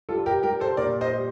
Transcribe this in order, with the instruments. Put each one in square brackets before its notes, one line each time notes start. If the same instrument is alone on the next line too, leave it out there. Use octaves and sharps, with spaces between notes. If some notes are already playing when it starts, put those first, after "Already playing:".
[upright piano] G3 F4 A4
G4 A#4
G3 G4 A#4
A4 C5
A#2 A#4 D5
C5 D#5
G3